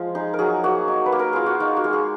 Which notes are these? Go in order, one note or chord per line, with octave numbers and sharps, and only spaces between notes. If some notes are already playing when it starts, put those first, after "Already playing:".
Already playing: F3 G#3 F4
D#4 G#4
A#4
F#3 G#4
A#3 F#4
D#4
B4
A#3
A#4
F4 G#4
F#4
D#4 F4
F#4
G#3
G#4